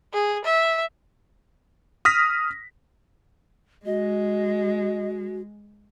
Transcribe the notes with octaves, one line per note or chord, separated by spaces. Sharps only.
G#4
E5
D#6 F6 A#6 B6
G#3 F#4 D#5